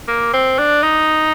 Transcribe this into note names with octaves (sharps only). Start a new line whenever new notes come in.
A#3
C4
D4
D#4